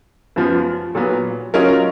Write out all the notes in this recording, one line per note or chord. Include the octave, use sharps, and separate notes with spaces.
F#2 F3 B3 F4
A#2 F#3 B3
F#3 C#4 F4 A#4 D#5